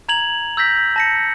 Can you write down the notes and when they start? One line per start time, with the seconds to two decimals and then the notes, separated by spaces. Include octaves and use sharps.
0.09 A#5 G#6 F7 F#7
0.57 E6 G6 A#6 B6
0.96 A5 A#6 C#7